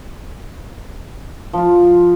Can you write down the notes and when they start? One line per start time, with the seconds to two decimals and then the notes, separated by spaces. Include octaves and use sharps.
1.53 F3 F4